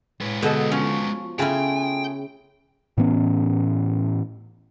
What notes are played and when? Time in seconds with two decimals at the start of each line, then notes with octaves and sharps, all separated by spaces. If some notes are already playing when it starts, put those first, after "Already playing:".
0.21 A2 G#3 B4
0.42 B2 D3 G#4 A4 D#5
0.72 F3 C#4
1.39 C#3 A3 E4 F4 G#4 G5 G#5
2.98 A2 E3 B3 C#4